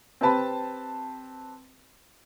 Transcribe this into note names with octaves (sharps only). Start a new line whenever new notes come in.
C4 G4 B4 A5 B5